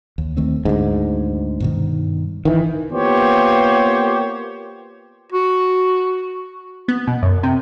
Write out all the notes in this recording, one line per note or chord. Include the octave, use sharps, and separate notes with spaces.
D#2
D#3 A3 C4
D2 G#2 D4
G2 B2 D#3
D#3 E3
A#3 B3 F4 G4 C5 C#5
F#4
B3
B2
F#2
C3